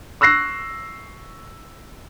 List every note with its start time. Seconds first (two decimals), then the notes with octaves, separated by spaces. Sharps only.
0.21 C#6 E6 F#6 A#6 C7